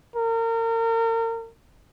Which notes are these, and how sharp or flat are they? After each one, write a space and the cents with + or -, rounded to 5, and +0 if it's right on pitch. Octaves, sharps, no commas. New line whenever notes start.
A#4 -35